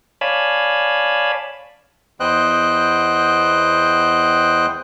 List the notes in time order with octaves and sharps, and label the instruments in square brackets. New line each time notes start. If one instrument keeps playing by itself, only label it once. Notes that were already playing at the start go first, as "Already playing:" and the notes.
[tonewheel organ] C#5 D5 F5 G#5 A5 B5
[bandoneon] E2 B3 C5 D#5 G5 F#6